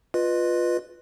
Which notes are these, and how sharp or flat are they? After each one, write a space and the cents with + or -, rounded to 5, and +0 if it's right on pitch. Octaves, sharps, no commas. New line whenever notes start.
F4 +10 B4 +0 D#5 -25